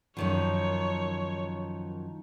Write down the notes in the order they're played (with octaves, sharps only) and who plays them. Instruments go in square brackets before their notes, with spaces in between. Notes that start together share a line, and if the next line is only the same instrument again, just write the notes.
[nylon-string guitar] F#2 D#3 F3 [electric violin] C#5